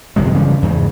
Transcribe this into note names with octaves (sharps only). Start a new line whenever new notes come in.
G1 F2 C3 G#3
C#3 E3 F3 G3
E2 G#2 C#3